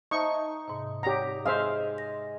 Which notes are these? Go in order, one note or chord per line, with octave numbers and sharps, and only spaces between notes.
D#4 C5 E5 A5 C#6
G#2 C3
G4 C#5 D5 F#5 A#5
G#3 C5 E5 F5
A#6